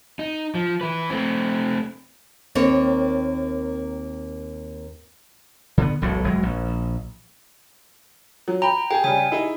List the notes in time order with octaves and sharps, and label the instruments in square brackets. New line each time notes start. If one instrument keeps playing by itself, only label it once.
[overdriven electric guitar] D#4
F3
E3 B4
A3 C4
[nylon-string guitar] D#2 A#3 C4 C#5
[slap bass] D3 B3
E1 B1 A2
F#1 F#3 G#3
A#1
[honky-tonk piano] F#3
[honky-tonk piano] G5 B5 [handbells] A#5
[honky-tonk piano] G#4 G#5 [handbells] G5
[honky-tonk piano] C#3 G3 [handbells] G#5
[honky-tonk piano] D#4 E4 G#4